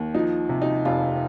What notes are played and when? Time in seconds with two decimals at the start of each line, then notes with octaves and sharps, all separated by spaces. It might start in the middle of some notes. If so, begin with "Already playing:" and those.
Already playing: D#2
0.15 F3 D#4
0.49 C3
0.62 D#4
0.85 F1 F4